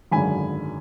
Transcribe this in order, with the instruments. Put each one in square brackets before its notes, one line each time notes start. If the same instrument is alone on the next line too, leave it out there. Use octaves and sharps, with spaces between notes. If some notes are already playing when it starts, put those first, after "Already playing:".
[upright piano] G#1 F#2 D3 G#3 G#5 B5